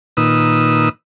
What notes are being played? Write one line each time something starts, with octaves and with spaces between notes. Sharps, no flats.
A#2 D#3 B4 D#6 E6